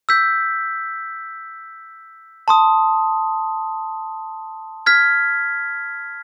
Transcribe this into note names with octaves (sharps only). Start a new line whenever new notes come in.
E6 G6 B6
A5 C6 D#6
F6 G#6 B6